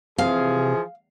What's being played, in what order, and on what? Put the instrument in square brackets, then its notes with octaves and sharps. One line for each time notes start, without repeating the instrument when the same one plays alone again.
[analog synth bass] C3 [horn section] E3 F3 G#4 [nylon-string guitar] F5